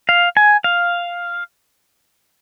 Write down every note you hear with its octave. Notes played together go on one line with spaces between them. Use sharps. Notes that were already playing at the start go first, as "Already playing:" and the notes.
F5
G#5
F5